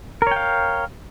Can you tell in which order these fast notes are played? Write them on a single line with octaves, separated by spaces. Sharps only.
A#4 C#5 G5 F5